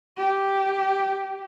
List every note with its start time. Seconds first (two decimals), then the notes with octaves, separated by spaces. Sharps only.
0.17 G4